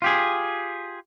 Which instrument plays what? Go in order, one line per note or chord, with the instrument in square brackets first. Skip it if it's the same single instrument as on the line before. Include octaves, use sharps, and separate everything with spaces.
[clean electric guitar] F4 G4 G#4